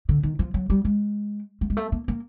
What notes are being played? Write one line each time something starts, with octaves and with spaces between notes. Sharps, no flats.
D3
D#3
F3
F#3
G3
G#3
A3
G#3
A3
A#3
A#3